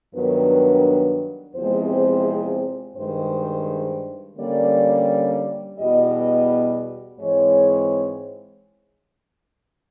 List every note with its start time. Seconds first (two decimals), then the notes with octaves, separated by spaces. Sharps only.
0.15 G2 D#3 F#3 B3 D4 A#4
1.56 E2 C3 F3 G#3 C4 C5
2.97 G2 D#3 G#3 C5
4.38 D3 G3 A#3 C#4 D5
5.79 E2 B2 G3 D#5
7.20 G#2 E3 G#3 C4 C#5